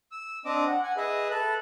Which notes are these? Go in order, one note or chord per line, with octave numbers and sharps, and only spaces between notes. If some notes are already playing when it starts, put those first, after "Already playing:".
E6
C4 D4 D#5 D6
F#5
F#5 G#5
G#4 B4 D#5 E5
A4 B4 F#6